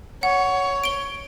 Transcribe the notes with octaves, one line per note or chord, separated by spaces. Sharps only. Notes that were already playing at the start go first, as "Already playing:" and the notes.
C#5 F#5
D7 G7